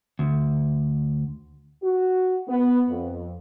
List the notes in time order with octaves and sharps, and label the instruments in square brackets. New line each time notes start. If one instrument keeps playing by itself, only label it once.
[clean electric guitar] D2
[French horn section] F#4
B3
F2